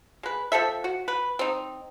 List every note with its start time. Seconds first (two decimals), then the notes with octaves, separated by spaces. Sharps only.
0.23 G#3 B4
0.52 F3 C4 A4 E5
0.84 F#4
1.08 B4
1.39 C4 D#4